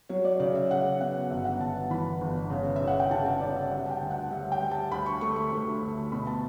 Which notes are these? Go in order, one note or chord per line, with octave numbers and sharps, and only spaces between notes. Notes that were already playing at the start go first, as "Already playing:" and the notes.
F#3 C#5
D5
C#3 D5
E5
C#3 F#5
B3 F#5
G1 E5
F#5
G1 A5
E3 B5
G1
C#3
E5
C#3
F#5
G5
C#3 A5
A5
C#3 D5
E5
G3 F#5
A5
G5
D2
F#5
G3 E5
G5
G3
A5
D2 B5
C#6
A3 C#6
C#6
D2
D2
B2 B5
A5